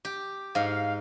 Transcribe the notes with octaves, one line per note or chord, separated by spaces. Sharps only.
G4
G#2 F5